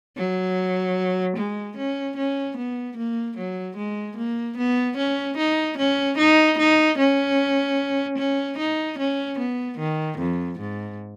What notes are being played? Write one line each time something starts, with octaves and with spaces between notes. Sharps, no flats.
F#3
G#3
C#4
C#4
B3
A#3
F#3
G#3
A#3
B3
C#4
D#4
C#4
D#4
D#4
C#4
C#4
D#4
C#4
B3
D#3
F2
G#2